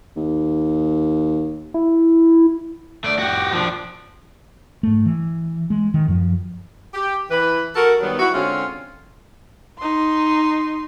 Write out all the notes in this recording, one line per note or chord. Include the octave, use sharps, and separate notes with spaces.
D#2
E4
A3 D5
F#4 G4
F3 D4
G#2 A3
E3
G#3
D#3
F#2 F3
G4
E3 B4
F#4 A4 A#4
D#3 F#3 G3 B3
E4 F#4
D3 G#3 C4 C#4 F4
D#4 C6